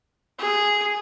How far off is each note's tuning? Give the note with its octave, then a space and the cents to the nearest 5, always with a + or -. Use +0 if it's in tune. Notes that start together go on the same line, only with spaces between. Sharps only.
G#4 -5